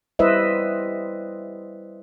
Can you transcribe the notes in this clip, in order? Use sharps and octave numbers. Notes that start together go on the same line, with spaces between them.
G3 E4 B4 C5 D#5 E5